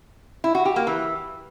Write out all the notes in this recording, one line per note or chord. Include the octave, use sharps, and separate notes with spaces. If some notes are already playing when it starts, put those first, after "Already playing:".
E4
F#4
G4
A#3
E3